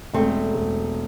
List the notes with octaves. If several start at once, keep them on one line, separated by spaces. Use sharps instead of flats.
E1 A3 C4
E1